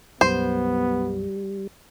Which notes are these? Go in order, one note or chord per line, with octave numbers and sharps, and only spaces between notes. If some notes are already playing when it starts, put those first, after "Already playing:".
B1 F#2 G3 B3 C5